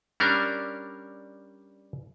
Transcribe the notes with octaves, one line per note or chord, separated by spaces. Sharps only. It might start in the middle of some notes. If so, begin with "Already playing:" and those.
G3 C#4 D4 A#4